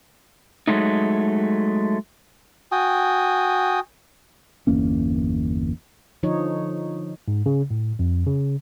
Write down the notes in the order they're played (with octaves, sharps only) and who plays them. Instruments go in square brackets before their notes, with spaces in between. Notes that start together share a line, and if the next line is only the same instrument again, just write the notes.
[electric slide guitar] F#3 G#3 A3 D#4
[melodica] F#4 G5 G#5 D#6
[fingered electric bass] G1 E2 A#3 C#4
[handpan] D3 F3 D#4 C#5
[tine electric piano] G#2
C#3
A2
F2
C#3